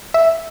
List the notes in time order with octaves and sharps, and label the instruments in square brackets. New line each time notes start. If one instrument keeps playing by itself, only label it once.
[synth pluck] E5